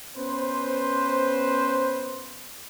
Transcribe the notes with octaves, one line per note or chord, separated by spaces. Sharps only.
B3 C#4 B4 C5